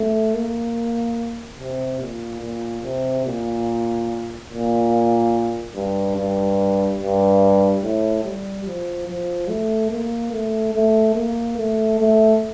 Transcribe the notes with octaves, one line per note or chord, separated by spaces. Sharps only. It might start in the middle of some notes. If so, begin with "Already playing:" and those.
Already playing: A3
A#3
C3
A#2
A#2
C3
A#2
A#2
G2
G2
G2
A2
G3
F3
F3
A3
A#3
A3
A3
A#3
A3
A3